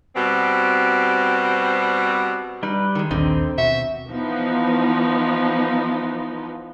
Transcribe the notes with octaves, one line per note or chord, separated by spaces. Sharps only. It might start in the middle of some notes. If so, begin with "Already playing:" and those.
B2 G3 C4
G3 D#4 B4
D#3 G#3
A#1 D#2 D3 D#3 C4 D#4
B2 F#4 E5
E3 F3 B3 D#4